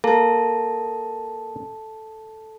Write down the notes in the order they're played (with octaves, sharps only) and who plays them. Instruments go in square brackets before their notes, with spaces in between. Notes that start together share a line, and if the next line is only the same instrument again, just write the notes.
[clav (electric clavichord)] A#3 [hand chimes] A4 A5